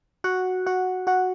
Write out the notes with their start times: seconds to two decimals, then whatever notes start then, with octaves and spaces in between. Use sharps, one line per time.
0.24 F#4 F#5
0.66 F#4 F#5
1.07 F#4 F#5